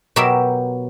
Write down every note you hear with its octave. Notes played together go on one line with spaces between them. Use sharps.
B2 F#3 G4 A#4 E5 G5